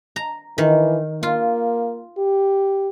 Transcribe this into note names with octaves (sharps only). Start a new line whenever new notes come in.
A#5
D#3 E3
A#3 F4
G4